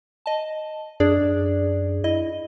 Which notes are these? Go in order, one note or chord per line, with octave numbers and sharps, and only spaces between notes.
D#5 A5
F#2 D4 G#4 D5
E4 D#5